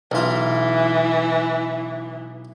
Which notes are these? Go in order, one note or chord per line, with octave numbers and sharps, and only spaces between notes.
B1 E3 F4